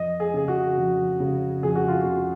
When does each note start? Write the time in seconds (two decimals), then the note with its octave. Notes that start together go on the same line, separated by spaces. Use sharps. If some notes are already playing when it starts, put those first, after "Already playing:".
Already playing: F2 D#5
0.20 G#4
0.34 C#3 G#4
0.48 F#4
0.77 F2
1.20 C#3
1.63 F2 G#4
1.76 F#4
1.88 F4
2.01 C#3 F#4